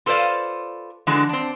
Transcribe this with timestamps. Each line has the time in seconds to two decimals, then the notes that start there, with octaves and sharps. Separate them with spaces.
0.06 F4 A4 B4 C5 D5 F5
1.07 D3 E3 G#3 D4 F#4
1.29 C4 D4